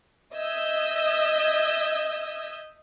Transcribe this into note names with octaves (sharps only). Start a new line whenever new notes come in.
D#5 E5 D#6 E6 G6 G#6